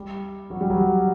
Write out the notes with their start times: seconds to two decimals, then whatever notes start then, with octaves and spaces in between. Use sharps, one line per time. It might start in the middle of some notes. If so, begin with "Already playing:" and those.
Already playing: G3
0.50 F#3
0.60 G3
0.70 F#3